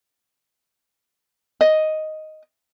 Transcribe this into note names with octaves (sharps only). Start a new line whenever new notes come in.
D#5